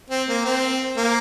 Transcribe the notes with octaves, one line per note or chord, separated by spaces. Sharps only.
C4
A#3
C4
A#3